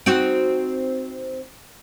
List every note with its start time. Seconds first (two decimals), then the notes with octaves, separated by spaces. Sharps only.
0.06 C4 D#4 F#4